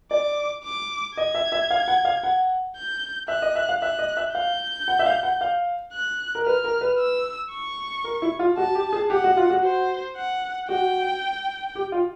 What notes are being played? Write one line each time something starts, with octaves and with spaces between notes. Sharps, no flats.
D5 D6
D6
D#5 G#6
E5
E5
F5
F#5
F5
F#5
G6
E5 F#6
D#5
E5
F5
E5 F#6
D#5
E5
F5 G6
F#5
E5
F5
F#5
F5
F#6
A#4
B4 F6
A#4
B4
E6
C#6
A#4
E4
F4
F#4 A5
G4
G#4
G4 F#5
F#4
F4
F#4
C5
F#5
F#4 G5
G4
F4